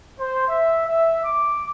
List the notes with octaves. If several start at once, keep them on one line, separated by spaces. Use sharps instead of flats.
C5
E5
E5
D6